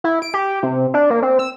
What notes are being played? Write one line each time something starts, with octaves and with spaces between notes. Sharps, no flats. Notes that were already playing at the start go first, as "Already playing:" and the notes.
E4
D7
G4
C3
D4
A#3
C4
E6